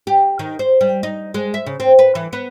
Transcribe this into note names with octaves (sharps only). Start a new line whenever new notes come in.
G4
D#3
C5
G3
D#4
G#3
E5
C#3
C4
B4
E3
B3